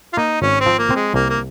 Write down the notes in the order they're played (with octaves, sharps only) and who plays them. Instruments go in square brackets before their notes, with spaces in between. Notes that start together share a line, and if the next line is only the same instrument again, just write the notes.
[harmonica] F4
[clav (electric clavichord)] A#3 [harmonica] D#4
[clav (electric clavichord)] G#1 [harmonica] C#4
[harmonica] C4
[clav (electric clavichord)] F3
[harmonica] A#3
[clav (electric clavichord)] C4
[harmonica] G#3
[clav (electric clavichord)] C2 [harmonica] A#3
[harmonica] A#3